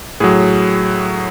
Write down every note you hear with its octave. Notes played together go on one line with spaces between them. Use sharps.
A2 F#3 G#4